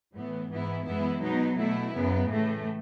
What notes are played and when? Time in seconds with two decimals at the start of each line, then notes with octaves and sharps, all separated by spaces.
0.15 A2 E3 B3
0.51 G#2 E3 B3 E4
0.86 F#2 E3 G#3 B3 E4
1.21 B2 F#3 B3 D#4
1.57 B2 A3 E4
1.93 F#2 C#3 F#3 B3
2.28 A2 E3 A3